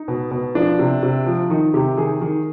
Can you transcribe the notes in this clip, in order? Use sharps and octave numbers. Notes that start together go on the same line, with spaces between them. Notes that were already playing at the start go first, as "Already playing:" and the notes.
Already playing: D#4
B2
B2
F3 D4
C3
C3
F3
D#3 D#4
C3 G4
D#3 G#4
D#3